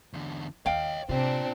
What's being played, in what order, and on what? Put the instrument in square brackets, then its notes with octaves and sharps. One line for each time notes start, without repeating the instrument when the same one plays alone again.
[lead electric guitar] E2 D3
[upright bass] D#2 [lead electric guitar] C#5 D#5 [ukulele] F5 G5
[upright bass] C3 [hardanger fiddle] C4 D4 [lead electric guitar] F4 D5